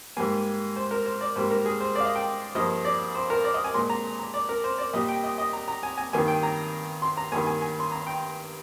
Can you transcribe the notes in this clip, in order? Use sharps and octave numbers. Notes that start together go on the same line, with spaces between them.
G#2 G3 A#3 G#5
C5
A#4
C5
D5
G#2 G3 A#3 C5
A#4
G#4
C5
D5
F5
D#5
G5
G2 F3 A#3 D#5
D5
C5
A#4
D5
D#5
G#5
A#2 G#3 C6
A#5
A#5
D5
A#4
C5
D5
A#2 G3 A#3 D#5
G5
D#5
D#5
A#5
A#5
G#5
G#5
G2 D#3 A#3 G#5
G5
A#5
C6
A#5
G2 D#3 A#3 G#5
G#5
G#5
C6
A#5
G5